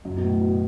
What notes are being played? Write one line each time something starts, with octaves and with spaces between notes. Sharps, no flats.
F#2
B2
A2
B2